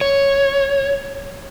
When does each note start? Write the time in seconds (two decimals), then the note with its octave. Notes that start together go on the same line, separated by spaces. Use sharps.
0.01 C#5